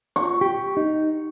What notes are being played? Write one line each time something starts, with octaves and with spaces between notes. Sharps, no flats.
C#6
G4
D#4